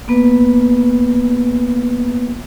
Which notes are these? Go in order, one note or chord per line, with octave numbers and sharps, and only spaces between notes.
A#3 B3 B4